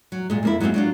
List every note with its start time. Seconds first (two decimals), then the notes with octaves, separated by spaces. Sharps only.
0.12 F#3
0.30 A#2 G#3
0.43 F2 A#3 E4
0.60 F#3 G#3 A#3 C4 F4
0.74 F#3 D4 F4